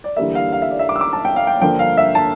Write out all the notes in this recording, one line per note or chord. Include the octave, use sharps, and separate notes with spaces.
D5
E2 D3 G3 A#3 E5
F5
F5
E5
D5
E5
D6
E6
D6
A5
G5
F5
G5
G2 D3 F3 A#3 G5
F5
E5
A5